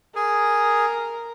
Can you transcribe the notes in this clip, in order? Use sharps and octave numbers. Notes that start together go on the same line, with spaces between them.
G#4 A#4